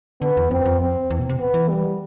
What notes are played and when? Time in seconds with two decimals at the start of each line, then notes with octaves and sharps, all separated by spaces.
0.21 D3 B3
0.37 E2
0.51 F2 C4
0.65 F2
0.81 C4
1.10 E2
1.19 B2
1.29 C3
1.40 B3
1.54 E3
1.68 G3